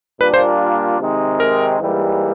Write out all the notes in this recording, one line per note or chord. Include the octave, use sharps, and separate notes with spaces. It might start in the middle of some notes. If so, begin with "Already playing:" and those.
A#2 G3 A#3 D4 F4 B4
C5
C3 D#3 G#3 C4 D#4
A#4
G#2 E3 G3 A#3